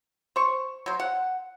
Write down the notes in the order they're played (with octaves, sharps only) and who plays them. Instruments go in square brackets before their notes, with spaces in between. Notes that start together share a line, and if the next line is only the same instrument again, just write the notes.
[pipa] C5 C#6
F#3 C5
F#5